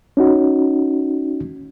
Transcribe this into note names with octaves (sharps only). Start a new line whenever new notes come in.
C#4 D#4 F#4